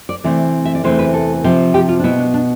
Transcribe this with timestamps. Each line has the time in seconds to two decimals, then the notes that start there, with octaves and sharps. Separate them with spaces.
0.09 D5
0.24 C3 E3 A3 C4 D5
0.65 E5
0.75 D5
0.84 E2 C3 E3 A3 C4 C5
0.99 B4
1.14 A4
1.44 C3 F3 C4
1.74 G4
1.89 F4
2.00 D4
2.04 B2 B3 E4
2.19 D4
2.34 D4